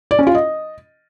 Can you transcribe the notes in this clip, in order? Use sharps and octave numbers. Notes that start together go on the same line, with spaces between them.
D5
C#4
F4
D#5